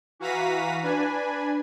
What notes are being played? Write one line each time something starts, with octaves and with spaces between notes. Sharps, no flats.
E3 F#4 F5 A#5 B6 D#7
D4 B4 G#5